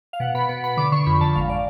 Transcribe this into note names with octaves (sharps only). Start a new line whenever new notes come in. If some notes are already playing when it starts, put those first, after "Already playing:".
F5
B2 F#5
B2 B5
B2 B5
B2 B5
D3 D6
D3 C#6
F2 B5
D3 A5
G#1 F5
D5